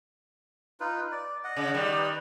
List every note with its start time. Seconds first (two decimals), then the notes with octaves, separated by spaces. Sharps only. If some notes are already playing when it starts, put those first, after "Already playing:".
0.80 D#4 F4 B4
1.12 D5
1.44 D#5 F#5
1.56 C#3
1.74 D#3 G3
1.98 B4